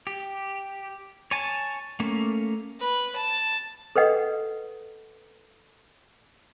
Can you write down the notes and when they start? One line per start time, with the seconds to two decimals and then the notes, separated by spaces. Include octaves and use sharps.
0.07 G4
1.31 C#5 G#5 A5
2.00 A3 A#3 C#4
2.80 B4
3.16 A5
3.96 A4 B4 D#5 F#5